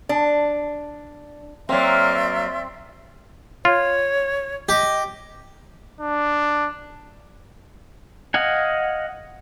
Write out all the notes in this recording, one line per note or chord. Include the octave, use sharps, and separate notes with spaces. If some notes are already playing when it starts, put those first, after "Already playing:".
D4
F#3 A#3 C4 D5 E5 C6
F4 C#5
G4 D#5
D4
D#5 F5 F#5 G#5